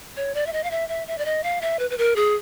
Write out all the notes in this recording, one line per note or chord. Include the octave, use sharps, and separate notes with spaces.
C#5
D5
E5
D#5
F5
E5
E5
E5
D5
D#5
F5
E5
B4
B4
A#4
G#4